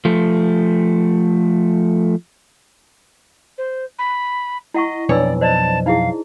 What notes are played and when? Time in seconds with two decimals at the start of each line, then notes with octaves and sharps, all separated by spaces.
0.05 F3 A3
3.58 C5
3.99 B5
4.74 E4 D#5 F#5 C#6
5.09 B1 F2 D4 B4 C#5 D5 E6
5.41 C5 D5 D#5 A5
5.86 D#4 E4 G#4 F5